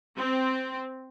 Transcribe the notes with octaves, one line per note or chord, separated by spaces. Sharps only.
C4